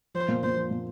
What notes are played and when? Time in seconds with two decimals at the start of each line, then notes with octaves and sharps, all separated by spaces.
0.14 F3 C5
0.28 A#2
0.43 A#2 C5
0.57 F3
0.71 A#2